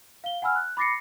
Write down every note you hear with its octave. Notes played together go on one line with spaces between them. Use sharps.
F5 G7
F#5 G#5 B5 E6 F6
F#6
B5 D6 A6 A#6 C7 C#7